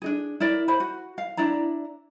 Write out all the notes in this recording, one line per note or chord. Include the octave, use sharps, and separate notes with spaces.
D4 D#4 G#4
E4 A#4 D5
C5 B5
F#4
F5
D4 E4 D5 A#5